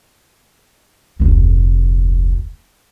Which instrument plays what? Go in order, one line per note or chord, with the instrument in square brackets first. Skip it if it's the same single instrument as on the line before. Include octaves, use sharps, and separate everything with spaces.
[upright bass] F1 D2